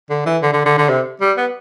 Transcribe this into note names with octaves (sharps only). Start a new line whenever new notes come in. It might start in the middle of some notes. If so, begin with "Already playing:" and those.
D3
E3
D3
D3
D3
D3
C3
G3
B3